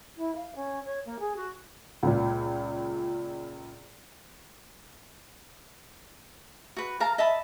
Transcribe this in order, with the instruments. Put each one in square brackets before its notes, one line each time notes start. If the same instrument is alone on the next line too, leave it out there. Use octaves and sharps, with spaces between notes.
[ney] E4
F5
C#4
C#5
A#3
G#4
F#4
[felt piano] C#2 A#2
[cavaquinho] F#4 B4
A#4 F5 A5 A#5
D#5 E5 A5 B5